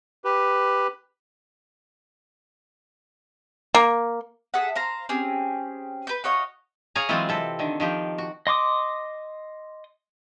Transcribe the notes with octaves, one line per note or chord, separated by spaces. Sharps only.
G4 B4
A#3
G#4 A4 E5 F#5
C5 F5 A#5 C6
C4 C#4 G4 G#4
B4 G6
F#4 C#5 D#5 F5
G#4 C#5 F5 G#5 A#5
E3 F#3 G#3 C4 F4
C3 A4
D3 D#3
D#3 F3 G4
F#4
D#5 C6 D6 D#6